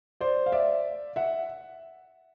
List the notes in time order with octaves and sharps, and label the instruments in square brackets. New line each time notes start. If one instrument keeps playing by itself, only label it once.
[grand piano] C5 D5
F5
D5 E5
E5 F#5